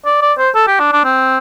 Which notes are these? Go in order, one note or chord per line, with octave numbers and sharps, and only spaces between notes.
D5
D5
C5
A4
G4
D4
D4
C4